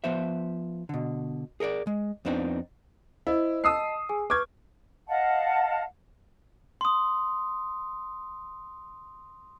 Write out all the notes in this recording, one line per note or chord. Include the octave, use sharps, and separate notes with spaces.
F3 B3 C5 E5
B2 D3
G#4 A#4 C#5 D5
G#3
F2 B3 C4 D4 D#4
E4 C5 D#5
D#5 A5 D#6 E6 C7
G#4 G#5
B4 C#6 D6 F6 G6 G#6
D#5 F5 F#5 A5
C6 D#6